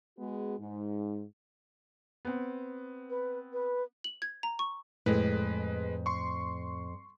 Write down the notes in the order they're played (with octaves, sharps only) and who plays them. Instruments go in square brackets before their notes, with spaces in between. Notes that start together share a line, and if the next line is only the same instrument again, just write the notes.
[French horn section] G#3 B3 F#4 G#4
G#2
[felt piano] B3 C4
[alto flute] B4
B4
[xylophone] F#7
G#6
A#5
C#6
[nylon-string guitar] F2 [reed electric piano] A2 [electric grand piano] G#3 B4
[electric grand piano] C6 C#6